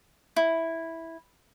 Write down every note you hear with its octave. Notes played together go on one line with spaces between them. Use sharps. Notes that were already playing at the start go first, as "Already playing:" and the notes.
E4